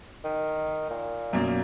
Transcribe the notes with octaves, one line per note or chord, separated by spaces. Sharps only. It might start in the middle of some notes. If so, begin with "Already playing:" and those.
D#3
A#2
F#2 B2 A#3